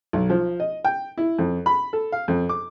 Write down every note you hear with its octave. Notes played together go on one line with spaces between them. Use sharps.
B1
F3
D#5
G5
E4
F2
B5
A4
F5
F2
D6